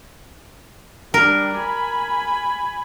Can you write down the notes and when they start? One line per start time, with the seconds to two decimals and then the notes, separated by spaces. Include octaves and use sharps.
1.14 G3 D4 A#4
1.58 G#5 B5